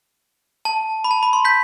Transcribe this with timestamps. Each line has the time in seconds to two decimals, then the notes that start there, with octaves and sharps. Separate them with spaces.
0.65 A5
1.04 B5
1.11 A5
1.23 B5
1.33 C6
1.45 G6 B6